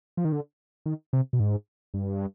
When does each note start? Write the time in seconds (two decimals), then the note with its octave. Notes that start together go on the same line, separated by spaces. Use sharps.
0.17 F3
0.25 D#3
0.32 D3
0.86 D#3
1.13 C3
1.33 B2
1.40 G#2
1.94 G2